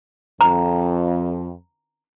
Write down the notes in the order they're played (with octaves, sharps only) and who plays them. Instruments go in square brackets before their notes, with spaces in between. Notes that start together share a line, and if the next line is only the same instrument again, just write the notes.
[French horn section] F2 [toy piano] A#5